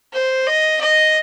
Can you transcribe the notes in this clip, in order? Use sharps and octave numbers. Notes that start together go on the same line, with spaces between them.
C5
D#5
D#5